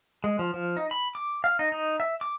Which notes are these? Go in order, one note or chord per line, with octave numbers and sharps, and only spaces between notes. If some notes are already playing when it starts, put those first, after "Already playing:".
G#3
F3
F3
D#4
B5
D6
F5
D#4
D#4
E5
D6